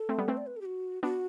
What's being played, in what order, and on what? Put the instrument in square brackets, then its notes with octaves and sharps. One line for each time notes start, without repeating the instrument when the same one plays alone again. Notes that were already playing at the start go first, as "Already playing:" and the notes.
Already playing: [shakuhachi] A4
[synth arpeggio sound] A3 C4
G3 B3
[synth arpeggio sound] A3 C4 [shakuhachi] B4
[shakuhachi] D5
B4
A4
G4
F#4
[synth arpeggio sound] B3 D4 [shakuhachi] F#4